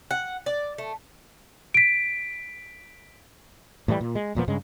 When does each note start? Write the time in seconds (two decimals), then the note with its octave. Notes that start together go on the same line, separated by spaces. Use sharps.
0.11 F#5
0.46 D5
0.78 A3
1.74 B6 D7
3.88 A2 E3 F#3 G3
4.01 A#2
4.15 G#3
4.35 E1 A#2 F3 B3
4.48 G2 C#3 G#3